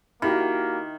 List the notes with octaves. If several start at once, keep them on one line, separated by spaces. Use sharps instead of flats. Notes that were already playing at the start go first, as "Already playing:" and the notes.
D#3 A#3 E4 F#4 G4 B5